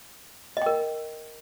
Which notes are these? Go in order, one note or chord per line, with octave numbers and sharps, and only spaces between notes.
A#4 D#5 G5